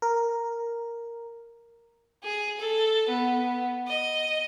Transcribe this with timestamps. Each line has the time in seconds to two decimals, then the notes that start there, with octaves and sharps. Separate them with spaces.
0.02 A#4
2.23 G#4
2.59 A4
3.08 B3
3.87 D#5